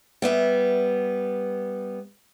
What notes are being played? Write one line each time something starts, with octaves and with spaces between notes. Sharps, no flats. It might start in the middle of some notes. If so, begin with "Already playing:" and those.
G3 B3 E5